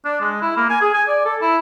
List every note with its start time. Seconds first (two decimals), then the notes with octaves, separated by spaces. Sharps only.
0.05 D4
0.21 G#3
0.42 E4
0.57 A#3
0.70 G#5
0.81 G#4
0.94 G#5
1.08 D5
1.25 A4
1.42 E4